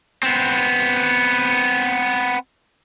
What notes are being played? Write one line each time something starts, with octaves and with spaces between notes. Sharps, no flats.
B3 C4